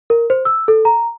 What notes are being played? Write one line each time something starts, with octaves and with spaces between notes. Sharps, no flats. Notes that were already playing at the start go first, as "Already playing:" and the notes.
A#4
C5
E6
A4
A#5